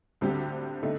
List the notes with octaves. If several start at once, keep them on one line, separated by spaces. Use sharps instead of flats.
D2 D3 G3 C4 G4
D3 A3 D#4